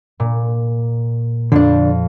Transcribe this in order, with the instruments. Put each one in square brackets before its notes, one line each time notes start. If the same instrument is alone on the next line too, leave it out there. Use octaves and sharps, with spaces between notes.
[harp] A#2
[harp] F2 [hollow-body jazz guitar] D3 D4